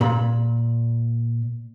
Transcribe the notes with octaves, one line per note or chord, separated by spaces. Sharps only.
A#2 B5